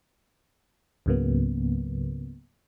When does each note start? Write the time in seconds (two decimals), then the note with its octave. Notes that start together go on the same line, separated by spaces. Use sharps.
1.06 C#2 G#2 C#3 F#3 A#3 B3